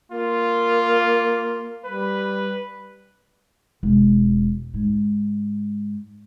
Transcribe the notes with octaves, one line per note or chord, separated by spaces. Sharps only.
A#3 F4
G3 B4
E1
G#2